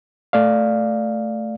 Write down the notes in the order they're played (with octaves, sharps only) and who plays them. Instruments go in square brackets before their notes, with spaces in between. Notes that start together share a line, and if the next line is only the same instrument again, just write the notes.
[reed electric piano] A3 D5 F5